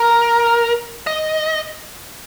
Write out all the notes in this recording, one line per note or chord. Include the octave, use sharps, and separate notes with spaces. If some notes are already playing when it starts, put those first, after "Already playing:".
Already playing: A#4
D#5